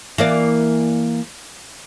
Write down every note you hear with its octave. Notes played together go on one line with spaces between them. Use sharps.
E3 A#3 D5